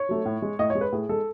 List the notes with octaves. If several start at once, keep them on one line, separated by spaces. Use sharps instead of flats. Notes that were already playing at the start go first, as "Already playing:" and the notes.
Already playing: C#5
F#3 A3
A2
G#3
A2 D#5
C#5
G#3
B4
A2 G#4
G#3 A4